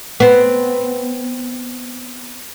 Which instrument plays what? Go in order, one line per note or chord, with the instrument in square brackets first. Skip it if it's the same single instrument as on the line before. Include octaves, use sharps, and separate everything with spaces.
[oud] B3 C4